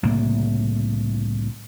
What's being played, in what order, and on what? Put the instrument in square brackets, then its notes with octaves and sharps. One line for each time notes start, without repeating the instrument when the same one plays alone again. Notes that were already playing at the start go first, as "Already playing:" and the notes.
[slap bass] C2 A2 C#3 A#3